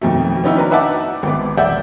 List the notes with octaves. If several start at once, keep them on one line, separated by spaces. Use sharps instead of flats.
F2 B2 D#3 F#3 A3
B3 C#4 D#4 E4 F#4
C#4 D4 B4 A#5
D#4 B4 E5 F#5 A5 D6
G#1 B3 D6
E1 D5 E5 F#5 G6